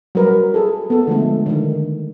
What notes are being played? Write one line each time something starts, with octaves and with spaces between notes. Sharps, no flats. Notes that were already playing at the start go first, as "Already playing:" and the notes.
F#3 G3 A#4 B4
G#4 A4
B3 A4
D3 F3 G#3 A3
D3 D#3